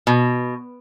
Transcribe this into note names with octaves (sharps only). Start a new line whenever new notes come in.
B2